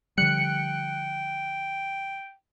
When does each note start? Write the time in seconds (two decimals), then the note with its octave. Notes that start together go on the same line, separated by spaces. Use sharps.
0.18 D3 F3 G3 G5 F#6 C#7